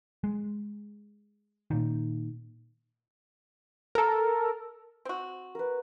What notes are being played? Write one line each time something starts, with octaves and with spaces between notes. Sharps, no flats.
G#3
A#2 D#3
A4 A#4
C4 F#4
A#4 B4